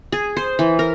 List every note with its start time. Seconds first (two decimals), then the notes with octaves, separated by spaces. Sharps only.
0.12 G#4
0.37 C5
0.59 E3
0.79 A#4